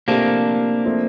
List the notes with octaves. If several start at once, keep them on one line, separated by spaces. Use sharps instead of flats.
C3 F3 A3 A#3 C4 D4 G4
F3 A3 C4